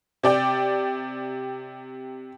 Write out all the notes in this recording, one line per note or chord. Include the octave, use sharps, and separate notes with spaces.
C3 D5 G5